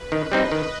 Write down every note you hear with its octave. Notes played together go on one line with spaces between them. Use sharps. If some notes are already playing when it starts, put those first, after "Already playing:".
Already playing: B4
D#3 D#5
G3 C4 D#4
D#3